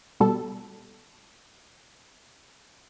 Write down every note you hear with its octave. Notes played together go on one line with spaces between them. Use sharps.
B2 G3 A4